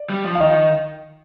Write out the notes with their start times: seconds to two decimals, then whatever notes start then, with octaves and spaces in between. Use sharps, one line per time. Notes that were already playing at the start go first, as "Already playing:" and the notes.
Already playing: D5
0.10 G3
0.25 F3
0.35 F5
0.40 D#3 D#5